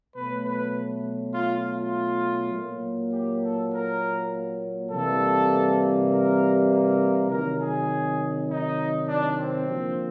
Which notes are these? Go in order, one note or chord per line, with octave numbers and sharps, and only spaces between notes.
B2 F#3 A3 B4
B4
F4
F4
A#2 F#3 A#3
G4
A4
A#4
C3 E3 G3 A#3 A4
A#4
A#4
C3 D#3 F#3 A#4
G#4
D#4
D4
C4
D3 F3 A#3